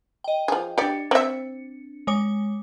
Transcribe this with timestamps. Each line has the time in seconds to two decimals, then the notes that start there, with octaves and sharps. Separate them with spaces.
0.24 D#5 G5
0.48 F3 G#4
0.78 D4 G4 D5 C#7
1.11 C4 E5
2.07 G#3 C#5 D6